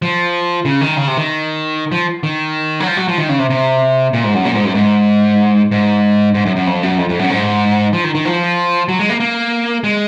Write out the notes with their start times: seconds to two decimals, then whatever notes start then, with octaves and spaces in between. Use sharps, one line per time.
0.02 F3
0.65 C#3
0.81 D#3
0.97 C#3
1.07 C3
1.17 D#3
1.92 F3
2.23 D#3
2.80 F#3
2.87 F3
2.97 F#3
3.08 F3
3.18 D#3
3.29 C#3
3.39 C3
3.50 C3
4.13 A#2
4.24 G#2
4.34 F#2
4.45 A#2
4.55 G#2
4.65 F#2
4.75 G#2
5.71 G#2
6.34 G#2
6.46 F#2
6.56 F#2
6.67 F2
6.83 F#2
6.98 F2
7.09 F2
7.19 F#2
7.30 G#2
7.93 F3
8.04 D#3
8.15 D#3
8.25 F3
8.88 F#3
8.99 G#3
9.09 A#3
9.20 A#3
9.84 G#3